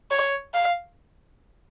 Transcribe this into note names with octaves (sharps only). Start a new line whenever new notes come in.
C#5
F5